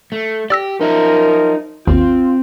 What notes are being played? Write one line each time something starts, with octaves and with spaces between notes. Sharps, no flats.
A3
G4 D5 E6 A#6
F3 F#3 D#4 A#4 E5
G#1 D#2 C4 F4